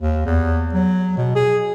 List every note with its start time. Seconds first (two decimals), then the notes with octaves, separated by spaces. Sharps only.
0.02 D#2
0.26 E2
0.73 F#3
1.17 B2
1.36 G#4